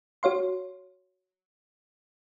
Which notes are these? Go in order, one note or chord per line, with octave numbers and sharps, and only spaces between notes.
F#4 C#5 F5 C6